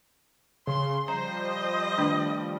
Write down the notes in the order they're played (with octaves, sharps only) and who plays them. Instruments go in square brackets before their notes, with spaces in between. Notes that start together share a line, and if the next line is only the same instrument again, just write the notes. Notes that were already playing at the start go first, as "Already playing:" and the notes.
[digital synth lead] C#3 [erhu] C6
[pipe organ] F3 G3 [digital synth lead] C5 [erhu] D#5 [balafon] A#5
[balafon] D#3 A3 D4